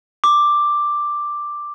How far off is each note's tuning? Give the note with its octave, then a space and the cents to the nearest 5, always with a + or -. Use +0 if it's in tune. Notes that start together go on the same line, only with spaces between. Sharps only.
D6 +5